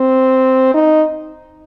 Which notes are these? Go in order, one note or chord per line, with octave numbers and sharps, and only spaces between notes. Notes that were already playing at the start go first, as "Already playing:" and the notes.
Already playing: C4
D#4